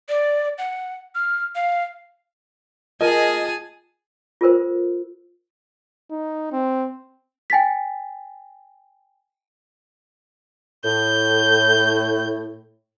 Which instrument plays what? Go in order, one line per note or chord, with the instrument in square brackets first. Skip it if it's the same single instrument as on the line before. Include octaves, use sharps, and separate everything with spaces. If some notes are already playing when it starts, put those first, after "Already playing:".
[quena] D5
F#5
F6
F5
[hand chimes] F4 [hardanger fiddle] G#4 A5 [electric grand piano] A#4 D#5 [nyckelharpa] G#5
[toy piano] F4 A4 A#4 C5
[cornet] D#4
C4
[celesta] G5 G#5 A6 B6
[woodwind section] A2 [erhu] G6